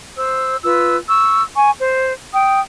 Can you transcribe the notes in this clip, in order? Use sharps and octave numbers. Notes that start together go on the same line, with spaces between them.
C5 E6
F4 B4 E6
C#6 E6
G#5 C#6
C5
G5 D#6